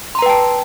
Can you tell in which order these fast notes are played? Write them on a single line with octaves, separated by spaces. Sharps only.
C6 A#5 B4 G5 A5